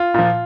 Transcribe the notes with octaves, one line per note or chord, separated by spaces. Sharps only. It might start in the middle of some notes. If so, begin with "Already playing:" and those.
Already playing: F4
A#2 F3